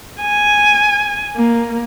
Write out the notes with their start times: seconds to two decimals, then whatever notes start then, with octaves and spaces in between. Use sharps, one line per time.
0.21 G#5
1.36 A#3